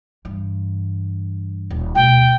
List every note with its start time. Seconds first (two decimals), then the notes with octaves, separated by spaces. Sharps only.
0.25 G2 E3
1.70 D#1
1.95 D2 B2 G5